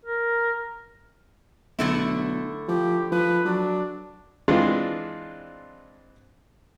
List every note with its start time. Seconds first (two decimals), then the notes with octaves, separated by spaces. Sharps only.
0.05 A#4
1.79 B1 D3 A3 E4
2.68 F3 G4
3.12 F3 B4
3.45 F#3 D4
4.48 E3 G#3 C4 D4 F4